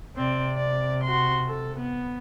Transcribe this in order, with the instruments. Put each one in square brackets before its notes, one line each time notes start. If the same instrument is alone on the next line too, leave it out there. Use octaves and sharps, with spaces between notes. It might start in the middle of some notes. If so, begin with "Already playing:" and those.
[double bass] C3 [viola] C4 D5
[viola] D5
F#4 C6
A4
B3